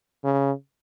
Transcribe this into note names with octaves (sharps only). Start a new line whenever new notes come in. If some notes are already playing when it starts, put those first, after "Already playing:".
C#3